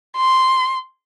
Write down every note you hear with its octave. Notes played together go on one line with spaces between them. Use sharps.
C6